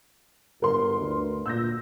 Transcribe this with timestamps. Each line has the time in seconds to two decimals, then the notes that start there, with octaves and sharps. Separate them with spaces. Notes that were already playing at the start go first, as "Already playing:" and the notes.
0.62 G1 A#4 B4 C6
1.00 D2
1.46 A#2 E6 G6 A#6